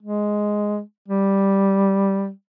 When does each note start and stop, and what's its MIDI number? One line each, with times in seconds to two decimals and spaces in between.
0.02 0.80 56
1.08 2.30 55